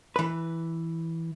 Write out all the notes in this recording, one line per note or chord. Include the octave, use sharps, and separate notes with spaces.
E3 B4